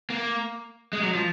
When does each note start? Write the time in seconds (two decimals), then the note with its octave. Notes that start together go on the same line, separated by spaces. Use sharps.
0.10 A#3
0.93 G#3
1.03 F#3
1.15 F3